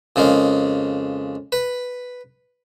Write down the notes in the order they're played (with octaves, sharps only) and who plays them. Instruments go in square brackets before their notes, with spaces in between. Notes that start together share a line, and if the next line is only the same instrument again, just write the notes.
[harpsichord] F2 C#3 G#3 A#3
B4